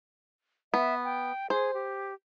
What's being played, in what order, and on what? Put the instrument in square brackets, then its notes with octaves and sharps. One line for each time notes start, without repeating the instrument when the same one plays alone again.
[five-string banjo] B3 [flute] E5
[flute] G5
[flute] G#4 [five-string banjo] C5
[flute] G4